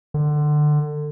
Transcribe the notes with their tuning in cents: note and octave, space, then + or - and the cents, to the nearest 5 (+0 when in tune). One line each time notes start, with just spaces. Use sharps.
D3 +25